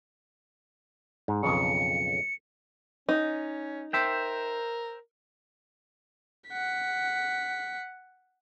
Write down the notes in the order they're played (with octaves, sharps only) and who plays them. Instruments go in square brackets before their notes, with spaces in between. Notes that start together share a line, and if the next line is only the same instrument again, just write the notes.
[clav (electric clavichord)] G#2
[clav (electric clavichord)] B1 F2 C#3 [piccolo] C#7
[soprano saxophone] C#4 [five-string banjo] D#4
[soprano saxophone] A#4 [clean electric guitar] C5 E5 G5
[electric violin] F#5 B6